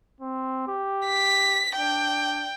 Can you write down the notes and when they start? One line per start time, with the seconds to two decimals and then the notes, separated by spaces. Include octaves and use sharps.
0.21 C4
0.68 G4
1.06 B6
1.76 D4 G5